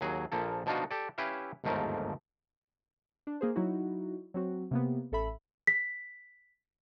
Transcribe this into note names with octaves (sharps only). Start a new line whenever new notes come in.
D#2 F#3 G#4
A#1 F3 A#3 A4
B2 F3 D4 D#4 F4 F#4
G4 A4 D5
C#4 E4 G4 B4 E5 F5
G1 D#2 G#2 F3 A3 A#4
D4
A#3 G#4 C5
F#3 D#4 E4 F#4
F#3 C4 F#4
C3 A#3 B3
A1 A4 E5 B5
B6